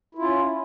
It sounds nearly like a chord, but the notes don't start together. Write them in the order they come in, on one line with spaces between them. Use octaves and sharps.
E4 F4 C#4